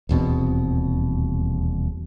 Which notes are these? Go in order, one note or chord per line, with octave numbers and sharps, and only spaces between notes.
D#1 E2 B2 C4